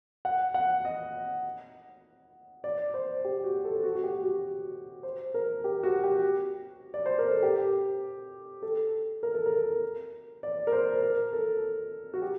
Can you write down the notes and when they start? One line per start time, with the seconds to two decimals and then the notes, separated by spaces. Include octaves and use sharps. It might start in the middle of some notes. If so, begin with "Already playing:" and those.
0.25 F#5
0.54 F#5
0.85 D#5
2.64 D5
2.94 C5
3.25 G4
3.44 F#4
3.65 A4
3.84 F#4
3.95 F#4
4.04 G4
4.23 F#4
5.03 C5
5.34 A#4
5.64 G4
5.83 F#4
6.04 G4
6.94 D5
7.06 C5
7.19 A#4
7.31 A4
7.43 G4
8.62 A4
9.23 A#4
9.34 A4
9.46 A#4
10.43 D5
10.67 A#4
10.72 C5
11.03 A#4
11.33 A4
12.14 F#4
12.22 G4